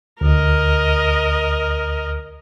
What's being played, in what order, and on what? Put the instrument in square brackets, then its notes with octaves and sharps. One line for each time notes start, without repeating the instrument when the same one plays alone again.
[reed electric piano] D2 [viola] A#4 D#5